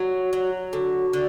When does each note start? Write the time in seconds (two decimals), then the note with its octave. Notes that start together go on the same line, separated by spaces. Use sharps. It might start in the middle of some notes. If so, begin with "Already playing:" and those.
Already playing: F#3 F#4
0.33 F#3
0.73 D3 F#4
1.13 D3